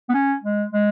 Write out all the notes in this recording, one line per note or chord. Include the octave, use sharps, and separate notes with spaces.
B3
C#4
G#3
G#3